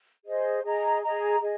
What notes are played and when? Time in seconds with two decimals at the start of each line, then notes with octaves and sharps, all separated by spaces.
0.26 G#4 C5 D#5
0.64 G#4 D#5 A#5
1.02 G#4 D#5 A#5
1.40 G#4 D#5